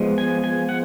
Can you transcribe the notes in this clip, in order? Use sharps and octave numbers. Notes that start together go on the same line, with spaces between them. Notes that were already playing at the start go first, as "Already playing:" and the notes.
Already playing: F3 G#3 B3
G#5
G#5
F#5